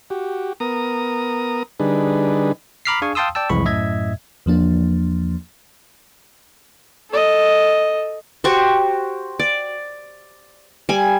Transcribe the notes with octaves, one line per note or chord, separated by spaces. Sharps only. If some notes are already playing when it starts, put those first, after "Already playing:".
F#4 G4
B3 A#4 A#5 D#6
D3 G3 D4 D#4 G#4 B4
A#5 B5 D6 F6 B6 C7
D4 G#4 F5 G#5 C#6
F5 G5 A5 C6 D#6 E6
D5 G5 A5 E6
C2 F2 E3 G#3 B5 C#6
F#2 A2 D#5 E5 G#6
E2 F3 A#3 D4
A4 D#5
F#4 G4 C5 C#6
D5
G3 G#5